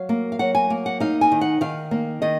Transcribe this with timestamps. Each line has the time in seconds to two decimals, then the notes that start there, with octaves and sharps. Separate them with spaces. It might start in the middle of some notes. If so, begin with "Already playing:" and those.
Already playing: F#3 F5
0.09 A#3
0.32 F5
0.39 F#3 F#5
0.55 G#5
0.70 A#3
0.86 F#5
1.00 D#4 F5
1.21 G#5
1.32 D#3
1.41 F#5
1.61 D#3 F5
1.91 A#3
2.22 D#3 D#5